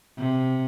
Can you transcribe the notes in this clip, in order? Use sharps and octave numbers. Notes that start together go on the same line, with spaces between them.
C3